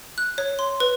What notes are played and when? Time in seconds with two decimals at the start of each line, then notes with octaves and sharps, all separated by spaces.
0.18 F#6
0.38 C#5
0.59 C6
0.80 B4